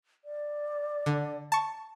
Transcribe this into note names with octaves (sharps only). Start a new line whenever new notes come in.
D5
D3
A5 C#6